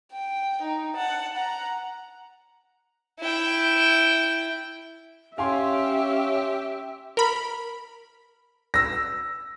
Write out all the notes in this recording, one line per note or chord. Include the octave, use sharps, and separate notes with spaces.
G5
D#4
F#5 A5
F#5 A#5
E4 G5
C#4 G4 E5 F5 G#5 C6
A#4 B5
E6 A#6